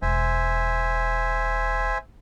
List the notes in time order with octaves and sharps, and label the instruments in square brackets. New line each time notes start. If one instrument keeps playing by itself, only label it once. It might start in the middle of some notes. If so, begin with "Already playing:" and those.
[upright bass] E1 [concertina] C5 E5 G#5